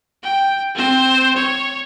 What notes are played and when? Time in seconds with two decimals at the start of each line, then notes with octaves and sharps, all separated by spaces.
0.23 G5
0.75 C4 C5
1.36 C#5